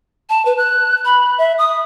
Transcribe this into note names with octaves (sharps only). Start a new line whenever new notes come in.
A5
B4
F#6
B5
E5
D#6